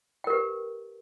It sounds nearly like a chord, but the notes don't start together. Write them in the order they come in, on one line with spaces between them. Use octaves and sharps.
G5 A#4 G4 B4